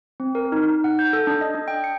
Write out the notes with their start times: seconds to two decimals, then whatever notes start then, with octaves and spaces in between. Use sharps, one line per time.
0.20 C4
0.35 A#4
0.52 D#4
0.70 D#4
0.84 F#5
0.99 G6
1.13 A4
1.27 D4
1.41 D#5
1.55 D4
1.68 G5
1.84 C#7